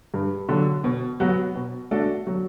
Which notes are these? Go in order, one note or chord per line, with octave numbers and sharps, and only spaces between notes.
G2
D3 F#3
B2
F#3 B3 F#4
B2
A3 D4 F#4 A4
F#3